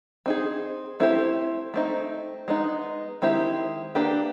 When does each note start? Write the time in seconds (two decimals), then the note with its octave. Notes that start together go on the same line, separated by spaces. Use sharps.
0.26 C4 D#4 G#4
1.00 A3 C4 E4 G4 C5
1.74 A3 C4 D#4
2.48 G#3 B3 D#4
3.22 D#3 G#3 C4 E4 G4
3.95 A#3 D4 G4 B4